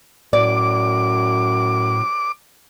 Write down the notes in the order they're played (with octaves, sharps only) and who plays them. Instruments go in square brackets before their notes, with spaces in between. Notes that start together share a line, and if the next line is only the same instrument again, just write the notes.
[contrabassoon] F#2 [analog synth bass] A2 [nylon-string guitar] D5 [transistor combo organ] D6